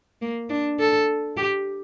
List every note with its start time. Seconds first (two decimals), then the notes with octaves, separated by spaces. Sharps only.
0.22 A#3
0.50 D4
0.79 A4
1.37 G4